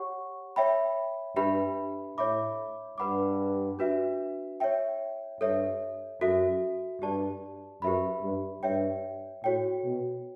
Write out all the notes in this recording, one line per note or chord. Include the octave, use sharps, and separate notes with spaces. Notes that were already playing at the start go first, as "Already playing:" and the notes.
Already playing: G4 C#5 F#5 C#6
C#5 E5 G5 B5
G2 D4 G4 B4 E5 B5
A2 C#5 E5 B5 D6
G2 B4 F#5 B5 D6
D4 F#4 B4 E5
C#5 E5 G5
G2 A4 C#5 E5
F#2 F#4 A4 E5
G2 G4 D5 A5
F#2 G4 B4 E5 B5
G2
G2 C#5 E5 G5
A2 F#4 C#5 G5
B2